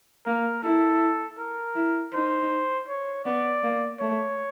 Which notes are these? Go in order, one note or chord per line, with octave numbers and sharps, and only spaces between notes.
A#3 A#4
E4 A4
A#4
E4
D#4 C5
C#5
B3 D5
A#3
A3 C#5